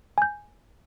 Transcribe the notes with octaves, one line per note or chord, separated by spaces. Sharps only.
G#5 G6